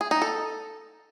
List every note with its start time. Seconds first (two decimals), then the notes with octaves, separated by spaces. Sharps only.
0.01 G#4
0.11 D#4
0.22 A4